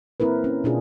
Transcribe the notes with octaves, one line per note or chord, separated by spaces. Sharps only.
A#3 C4 E4 A#4 B4
C#4
B2 D4 F4 G#4